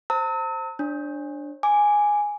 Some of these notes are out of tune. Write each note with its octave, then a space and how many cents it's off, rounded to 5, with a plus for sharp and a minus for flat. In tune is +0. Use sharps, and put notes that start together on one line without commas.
C5 +0 A5 +45 E6 -40
D4 +0 C#5 -40
G#5 +0 D6 +0